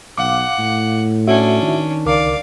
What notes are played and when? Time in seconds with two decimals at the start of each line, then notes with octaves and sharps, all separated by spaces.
0.18 B1 F5 F#5 D6
0.59 A2
1.27 C#4 D4 E4 F#4 E5
1.62 D#3
2.06 C#2 A#4 D5 F5 D6